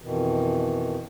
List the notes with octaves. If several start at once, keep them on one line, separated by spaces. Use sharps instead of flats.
F2 B2 D#3 E3